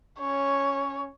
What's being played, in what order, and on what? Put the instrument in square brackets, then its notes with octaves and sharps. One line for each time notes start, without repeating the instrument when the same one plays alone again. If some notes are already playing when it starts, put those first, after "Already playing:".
[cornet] C#4 [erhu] C#5